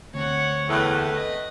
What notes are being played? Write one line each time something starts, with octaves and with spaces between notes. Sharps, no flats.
D2 C4 C#5 F#5
E2 A2 A3 B4
D#5